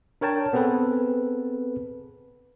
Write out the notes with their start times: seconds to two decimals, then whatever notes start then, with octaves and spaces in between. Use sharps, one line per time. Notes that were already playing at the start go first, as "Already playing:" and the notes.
0.21 D4 A#4 C#5 G5 A5
0.53 B3 C4 G#4 A4 B4